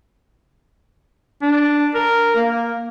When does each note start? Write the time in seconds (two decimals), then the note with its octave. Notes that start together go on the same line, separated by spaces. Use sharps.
1.42 D4
1.95 A#4
2.36 A#3